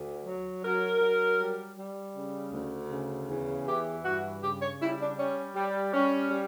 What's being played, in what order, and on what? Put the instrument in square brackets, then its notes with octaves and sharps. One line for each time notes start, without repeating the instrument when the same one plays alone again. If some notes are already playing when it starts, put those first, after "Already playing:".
Already playing: [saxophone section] D2
F#3
F#3 A#4
F#3
G3
G3
C#3
D2
C#3
E2
E3 G4
G2 F#4
C#3 G4
C#5
G3 E4
D4
G3 C#4
G3
G3 C#4
G3